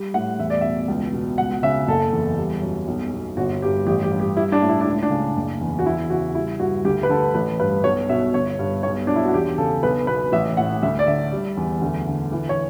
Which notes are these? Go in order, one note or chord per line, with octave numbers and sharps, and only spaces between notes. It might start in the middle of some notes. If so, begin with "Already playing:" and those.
Already playing: G3
A2 F#5
E2 E5
D5
B2 E5
C#2
B2
C#2 F#5
C#3 E5
F#1 A4
E2
G3
F#2
B1
B2
G1 F#4
G2 G4
A1 G4
G4
G2
G4
G3 E4
D4
A2
E4
D4
C#2
D4
C#3
F#1
E2
F#4
E2 E4
C#3 F#4
G3 E4
G2 F#4
D2 G4
B4
D3 A4
A1 B4
G2 B4
B1 C#5
B2 E5
G1 C#5
G2
B1 C#5
B2 D4
E4
F#4
E2 G4
C#3 A4
B1 B4
B2 B4
A1 E5
A2 F#5
D2 E5
D5
D3 E5
G3
E2
D2
D3
E3
C#5